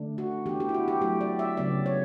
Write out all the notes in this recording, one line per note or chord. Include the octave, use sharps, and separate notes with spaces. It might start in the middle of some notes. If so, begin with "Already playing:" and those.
Already playing: D3 A3 D4
F#4
E3 B3 D4 G4
G4
E4
F#4
G4
F#3 A3 E4 G4
D5
E5
C#3 F#3 B3 D5
C#5